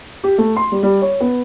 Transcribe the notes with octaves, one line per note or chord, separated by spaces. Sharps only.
G4
A3
C6
G3
G3
C#5
B3